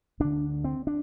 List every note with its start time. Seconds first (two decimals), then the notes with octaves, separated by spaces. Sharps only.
0.20 D2 D3 D4
0.64 C4
0.87 D4